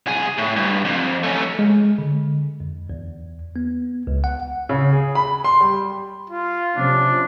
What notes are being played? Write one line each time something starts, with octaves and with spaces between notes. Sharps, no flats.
C2 G#4
A2
G2
F2
A3 C#4
G#3
D3
F2
E2
B3
C#2
F#5
C#3
G#4
B5
C6
G3
F4
C3 F3 C#4 D4